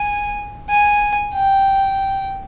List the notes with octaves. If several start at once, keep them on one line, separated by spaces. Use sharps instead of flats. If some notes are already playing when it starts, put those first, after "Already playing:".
Already playing: G#5
G#5
G5